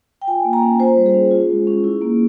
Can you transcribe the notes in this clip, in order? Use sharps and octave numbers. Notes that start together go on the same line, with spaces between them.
G5
F4 G#5
A#3
A#5
C#4
F4 C5
G3
G#4
C#4
F4
G#3
C#4
E4
A#3